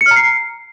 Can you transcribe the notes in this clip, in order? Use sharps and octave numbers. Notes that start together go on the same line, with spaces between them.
C#7
F6
A#5
C7